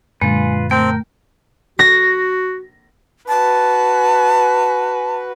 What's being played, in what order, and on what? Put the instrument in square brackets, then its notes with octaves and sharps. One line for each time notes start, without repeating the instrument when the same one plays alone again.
[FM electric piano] F#2 A#2 D3 [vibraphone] G#3 [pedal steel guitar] F4 B4
[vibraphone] A3 [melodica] C4 [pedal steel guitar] A#4 G5
[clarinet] F#4 [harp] A#6
[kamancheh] F#4 B4 [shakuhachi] A5